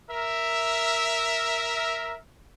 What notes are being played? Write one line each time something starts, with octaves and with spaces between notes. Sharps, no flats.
A#4 E5